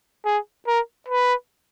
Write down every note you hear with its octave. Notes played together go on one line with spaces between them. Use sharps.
G#4
A#4
B4